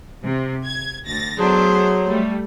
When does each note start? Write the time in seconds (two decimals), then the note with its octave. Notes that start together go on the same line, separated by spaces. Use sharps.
0.22 C3
0.63 G#6
1.06 D2 A6 A#6
1.39 F#3 A3 B3 D4 G#4 C5
2.08 G3 A3